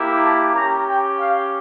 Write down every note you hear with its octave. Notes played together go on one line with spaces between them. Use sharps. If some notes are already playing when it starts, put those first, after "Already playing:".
Already playing: A#3 E4 G4
A5
C#4 G4 A#5
G5
F5